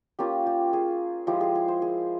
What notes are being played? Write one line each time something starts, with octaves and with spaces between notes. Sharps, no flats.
A#3 C#4 F4 G4
G4
G#4
F3 G#3 E4 G4
G#4
G#4
C5
G#4